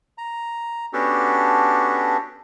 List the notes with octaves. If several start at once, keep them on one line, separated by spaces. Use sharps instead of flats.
A#5
B3 C#4 D4 F#4 G4 A4